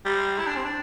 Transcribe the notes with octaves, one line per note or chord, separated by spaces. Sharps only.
G3
E4
D4
C4
D4